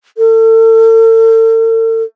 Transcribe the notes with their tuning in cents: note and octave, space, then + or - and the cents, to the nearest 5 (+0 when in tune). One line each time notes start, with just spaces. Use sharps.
A4 +40